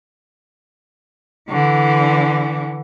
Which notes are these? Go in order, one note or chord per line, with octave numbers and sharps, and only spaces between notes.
D3 E3